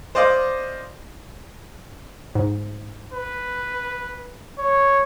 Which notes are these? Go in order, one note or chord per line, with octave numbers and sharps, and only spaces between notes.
C5 D5 D#5 F5 D6
G#2
B4
C#5